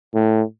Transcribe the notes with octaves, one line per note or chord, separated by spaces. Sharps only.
A2